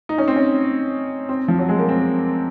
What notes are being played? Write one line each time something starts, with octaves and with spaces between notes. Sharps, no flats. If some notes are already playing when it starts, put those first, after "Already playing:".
D#4
C#4
C4
C#4
C4
F3
F#3
G#3
A#3
C4